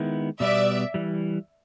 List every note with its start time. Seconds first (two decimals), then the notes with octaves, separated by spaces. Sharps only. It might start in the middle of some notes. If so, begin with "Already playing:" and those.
Already playing: D#3 G#3 B3 E4
0.39 B2 G3 B3 D5 E5
0.94 E3 G3